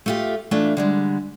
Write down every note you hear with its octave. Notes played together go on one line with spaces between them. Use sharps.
A3 F4 G4
E3 A3 D4 F4
D3 G3 G#3